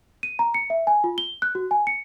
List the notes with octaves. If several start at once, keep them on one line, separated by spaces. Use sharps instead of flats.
D#7
A#5
C#7
E5
G#5
F4
G7
F#6
F#4
G#5
C#7